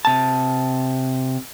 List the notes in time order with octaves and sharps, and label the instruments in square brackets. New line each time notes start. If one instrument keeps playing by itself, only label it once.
[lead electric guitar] C3 A5